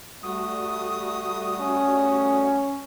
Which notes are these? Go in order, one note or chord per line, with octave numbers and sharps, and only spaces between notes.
G3 A3 F#4 D#6
C#4